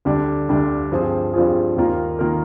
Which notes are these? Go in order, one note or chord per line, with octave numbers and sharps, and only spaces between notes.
D2 D3 G3 D4
D2 D3 G3 D4
G2 F3 C4 F4 G#4
G2 F3 C4 F4 G#4
D#2 D#3 A#3 F4 A#4
D#3 A#3 F4 A#4